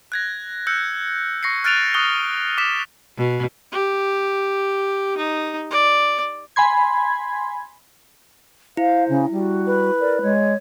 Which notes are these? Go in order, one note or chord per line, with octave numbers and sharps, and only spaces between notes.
F#6 G#6 A#6
E6 F#6 G6 C#7
C#6 A#6 C7 C#7
F6 F#6 A6 D7 D#7 F7
C#6 D#6 F#6 G7
D6 D#6 B6 E7
B2
G4
D#4
D5
G#5 B5 C6 G#6
E4 C5 F5
C#3
G3 F#4
B4
A#4 D5
G#3 C#5